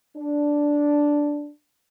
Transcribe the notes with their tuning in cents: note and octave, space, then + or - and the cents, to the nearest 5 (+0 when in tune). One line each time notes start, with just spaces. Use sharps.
D4 -5